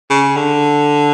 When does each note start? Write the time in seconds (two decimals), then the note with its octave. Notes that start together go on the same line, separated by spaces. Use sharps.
0.10 C#3
0.37 D3